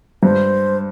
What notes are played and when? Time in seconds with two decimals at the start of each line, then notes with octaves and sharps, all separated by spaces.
0.23 G2 C5